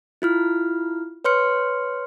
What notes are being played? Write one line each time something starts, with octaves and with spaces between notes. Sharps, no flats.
E4 F4 F6
B4 C#5 C6 F6 C#7